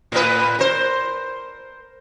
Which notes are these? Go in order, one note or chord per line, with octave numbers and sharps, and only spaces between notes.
A2 B4
A#4 C5